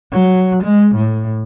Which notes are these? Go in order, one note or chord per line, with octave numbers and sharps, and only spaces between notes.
F#3
G#3
A2